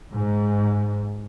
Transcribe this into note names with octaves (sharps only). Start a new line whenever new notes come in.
G#2